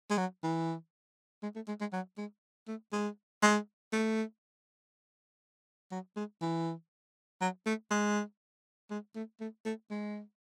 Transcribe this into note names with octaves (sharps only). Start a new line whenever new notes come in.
G#3
F#3
E3
G#3
A3
G#3
G#3
F#3
G#3
A3
G#3
G#3
A3
F#3
G#3
E3
F#3
A3
G#3
G#3
A3
A3
A3
G#3